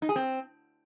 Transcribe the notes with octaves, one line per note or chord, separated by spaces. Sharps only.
D#4
G#4
C4